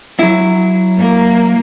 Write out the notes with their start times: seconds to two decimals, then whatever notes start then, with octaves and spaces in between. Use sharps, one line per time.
0.19 F#3 E4
0.98 A#3